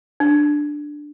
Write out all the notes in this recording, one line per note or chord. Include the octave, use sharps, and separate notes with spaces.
D4